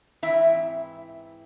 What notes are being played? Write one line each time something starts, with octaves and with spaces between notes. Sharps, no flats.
G#2 E3 C4 E4 E5